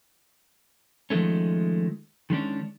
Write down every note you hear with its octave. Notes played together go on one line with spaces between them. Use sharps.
D#3 F3 G#3 A3 C#4
D#3 G#3 C#4 D4